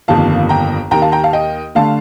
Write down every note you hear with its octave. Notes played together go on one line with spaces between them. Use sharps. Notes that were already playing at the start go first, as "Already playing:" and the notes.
G1 F2 D#3 A#3 F5 A5
G5 A#5
D#2 D#3 A#3 G5 A#5
F5 A5
G5 A#5
F5 A5
D#5 G5
D3 A3 F5 A5